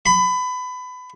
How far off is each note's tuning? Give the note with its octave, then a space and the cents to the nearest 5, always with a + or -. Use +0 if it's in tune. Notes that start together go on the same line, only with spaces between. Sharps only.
B5 +25